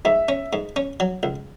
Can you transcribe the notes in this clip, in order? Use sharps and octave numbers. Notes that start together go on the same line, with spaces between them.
G#2 E5
C#4
G#2
C#4
F#3
C#2